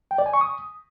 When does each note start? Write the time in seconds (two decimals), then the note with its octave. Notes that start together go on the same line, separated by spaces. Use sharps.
0.11 G5
0.18 D5
0.26 G#5
0.34 C#6
0.41 D#6